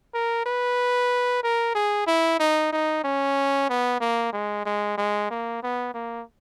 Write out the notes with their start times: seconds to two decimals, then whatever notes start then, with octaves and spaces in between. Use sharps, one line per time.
0.14 A#4
0.46 B4
1.43 A#4
1.75 G#4
2.07 E4
2.40 D#4
2.72 D#4
3.04 C#4
3.69 B3
4.01 A#3
4.33 G#3
4.66 G#3
4.98 G#3
5.31 A#3
5.63 B3
5.94 A#3